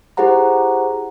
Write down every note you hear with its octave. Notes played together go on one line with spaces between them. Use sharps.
E4 G4 G#4 C5 F#5 A#5